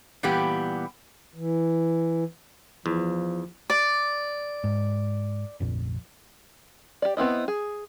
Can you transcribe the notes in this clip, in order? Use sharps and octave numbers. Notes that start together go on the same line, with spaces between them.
A#2 E3 G3 B3 G4
E3
E2 F3
D5
G#2
F1 A#1
G4 D5
B3 C4 E4 D#5
G#4